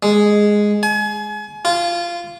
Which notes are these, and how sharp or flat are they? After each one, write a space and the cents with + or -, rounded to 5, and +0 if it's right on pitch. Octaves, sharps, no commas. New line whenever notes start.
G#3 +0
G#5 +35
F4 -15